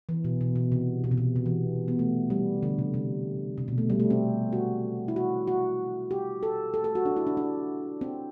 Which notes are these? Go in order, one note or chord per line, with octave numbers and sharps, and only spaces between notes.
E3
B2
B2
B2
C3
B2
C3
B2
C3
E3
B3
A3
G3
D3
C3
C3
C3
B2
A3
G3
A3
C4
F#4
E4
F#4
F#4
G4
A4
A4
A4
F#4
D4
E4
D4
D4
C4